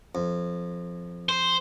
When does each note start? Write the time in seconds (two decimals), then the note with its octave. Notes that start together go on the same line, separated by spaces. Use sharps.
0.15 F2
1.29 C5